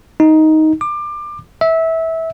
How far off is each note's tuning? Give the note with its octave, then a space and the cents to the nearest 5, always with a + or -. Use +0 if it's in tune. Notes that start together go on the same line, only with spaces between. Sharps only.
D#4 +10
D6 +25
E5 -20